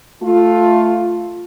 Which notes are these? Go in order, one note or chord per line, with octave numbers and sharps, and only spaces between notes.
A3 F4